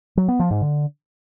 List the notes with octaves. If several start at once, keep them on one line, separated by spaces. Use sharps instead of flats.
F#3
B3
F3
G#2
D3